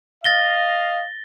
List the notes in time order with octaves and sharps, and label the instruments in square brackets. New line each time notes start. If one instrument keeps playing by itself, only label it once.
[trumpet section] D#5 F5 [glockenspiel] A6 A#6 G7